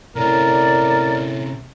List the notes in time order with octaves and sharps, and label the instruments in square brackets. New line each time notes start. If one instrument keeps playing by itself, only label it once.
[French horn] A2 [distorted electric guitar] C3 C#4 [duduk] A#4 [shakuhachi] D5